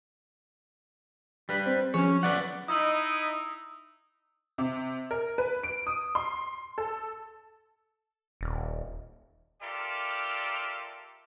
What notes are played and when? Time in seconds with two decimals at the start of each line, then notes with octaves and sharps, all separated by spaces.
1.49 G3 B4
1.66 C4 C5
1.94 F3 F#3 C#4 G#4 C#5
2.23 B4 D5 F#5
2.68 D#4 E4 D#5 D#6 E6 F#7
4.58 C3
5.11 A#4
5.38 B4
5.63 D7
5.87 D#6
6.15 C6
6.78 A4
8.41 D#1
9.62 F4 G4 A4 A#4 D5 E5